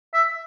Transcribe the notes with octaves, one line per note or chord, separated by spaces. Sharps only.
E5